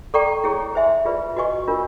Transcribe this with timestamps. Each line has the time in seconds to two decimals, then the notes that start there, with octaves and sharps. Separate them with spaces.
0.14 A4 D5 G5 A#5 C#6
0.44 E4 G#4 C#5
0.75 C5 E5 G#5 C6
1.05 F4 G#4 B4 D5
1.37 F#4 B4 D#5 G#5 C#6
1.67 D4 F4 A#4